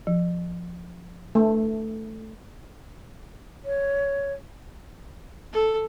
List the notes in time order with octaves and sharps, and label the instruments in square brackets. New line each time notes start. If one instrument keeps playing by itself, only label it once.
[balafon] F3
[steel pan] A3
[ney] C#5
[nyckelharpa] A4